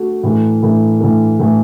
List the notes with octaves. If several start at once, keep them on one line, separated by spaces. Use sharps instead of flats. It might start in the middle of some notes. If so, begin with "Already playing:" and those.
Already playing: A3 F#4
A2 E3 A3
A2 E3 A3
A2 E3 A3
A2 E3 A3